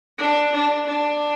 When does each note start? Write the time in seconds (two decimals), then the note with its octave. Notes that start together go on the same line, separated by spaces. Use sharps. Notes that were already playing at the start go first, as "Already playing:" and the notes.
0.18 D4
0.54 D4
0.88 D4